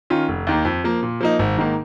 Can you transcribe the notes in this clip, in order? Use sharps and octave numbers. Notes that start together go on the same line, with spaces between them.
D#3 C#4 F4
F1
D#2 D#3 A#3
F2
F3 A#3
A#2
F3 A#3 D#4
G#1
G#2 D#3 A#3